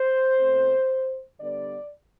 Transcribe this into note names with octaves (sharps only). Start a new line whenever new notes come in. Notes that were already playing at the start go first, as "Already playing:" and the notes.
Already playing: C5
B2 A3 C4
D3 G3 B3 D5